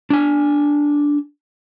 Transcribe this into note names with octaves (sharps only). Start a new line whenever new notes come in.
D4 G#5